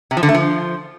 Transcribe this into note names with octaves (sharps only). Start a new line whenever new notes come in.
C3
F3
D3
A3
F3